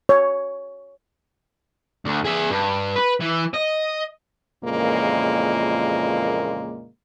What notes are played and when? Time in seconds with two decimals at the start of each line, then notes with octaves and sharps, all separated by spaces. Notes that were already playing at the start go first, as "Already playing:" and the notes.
0.09 C#5
2.05 D2
2.25 G#4 E5
2.50 G2
2.96 B4
3.20 E3
3.54 D#5
4.64 F2 A#2 C#3 E3 G#3 A#3